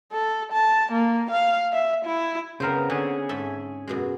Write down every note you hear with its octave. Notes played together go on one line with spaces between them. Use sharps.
A4
A5
A#3
F5
E5
E4
C#3 B3 C4 A#4 C5
D3 C#4 G#4
G#2 A4 E5
F#2 B2 G#3